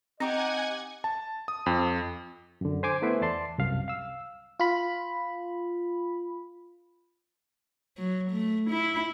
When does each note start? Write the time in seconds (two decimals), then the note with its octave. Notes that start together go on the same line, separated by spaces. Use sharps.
0.20 C4 D#4 G4 D#5 F#5 G#5 D6 G#6
1.04 A5
1.48 D#6
1.66 F2
2.61 F#2 D3
2.83 C5 G#5 D6 G#6
3.02 A3 B3 E4 B4 C5
3.21 E2 D5 A5 C6
3.58 C2 F#2 F5
3.88 F5 E6
4.60 F4 B5
7.98 F#3
8.31 A3
8.70 E4